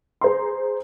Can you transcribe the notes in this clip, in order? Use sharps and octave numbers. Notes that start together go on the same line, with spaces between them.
G#4 C5 A#5 C6